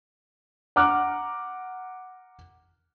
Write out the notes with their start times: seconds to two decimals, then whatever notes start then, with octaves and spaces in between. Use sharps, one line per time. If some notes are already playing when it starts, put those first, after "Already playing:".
0.76 F#5 A#5 D6 F6 F#6